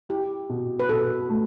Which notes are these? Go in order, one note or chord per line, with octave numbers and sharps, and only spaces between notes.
E4 G4
B2
B4
B2 A4
A3